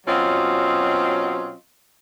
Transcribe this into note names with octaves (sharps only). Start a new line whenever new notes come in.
B2 F#3 C4 C#4 F4 D#5